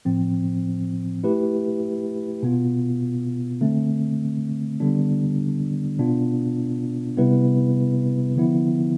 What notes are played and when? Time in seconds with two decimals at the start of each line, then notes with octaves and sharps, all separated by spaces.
0.05 A2 F3 C4
1.24 A3 E4 G4 B4
2.43 B2 B3 F4
3.61 D3 A3 C4
4.80 D3 G3 B3 D4
5.99 B2 B3 D4 F4
7.17 C3 G3 B3 E4 B4
8.36 D3 F3 B3 E4